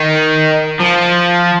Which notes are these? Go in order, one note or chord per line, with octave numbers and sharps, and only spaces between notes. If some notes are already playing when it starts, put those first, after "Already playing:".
Already playing: D#3
F3